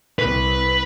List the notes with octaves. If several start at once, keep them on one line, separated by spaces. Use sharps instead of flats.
C2 B4